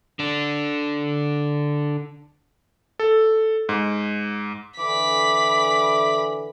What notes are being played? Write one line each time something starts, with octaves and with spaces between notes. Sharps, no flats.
D3 D4
A4
G#2
D3 E3 B5 D6 B6